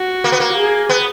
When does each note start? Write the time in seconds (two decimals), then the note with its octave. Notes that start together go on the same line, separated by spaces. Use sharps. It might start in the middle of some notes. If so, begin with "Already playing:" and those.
Already playing: F#4
0.24 A#3
0.32 B3
0.40 A#3
0.57 G#4
0.89 B3